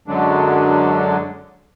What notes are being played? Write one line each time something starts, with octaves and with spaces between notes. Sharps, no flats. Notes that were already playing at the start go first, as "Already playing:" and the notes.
F#2 D3 F#3 G#3 D4